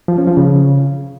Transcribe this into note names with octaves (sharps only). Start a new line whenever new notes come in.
F3
C#4
F3
C#3